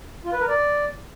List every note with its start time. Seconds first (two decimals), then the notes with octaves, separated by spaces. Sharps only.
0.25 F4
0.33 B4
0.40 A#4
0.48 D5